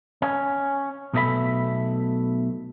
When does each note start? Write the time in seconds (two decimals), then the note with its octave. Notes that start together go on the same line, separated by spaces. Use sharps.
0.22 C#4
1.13 B1 B2 A3 C#4 E5 B5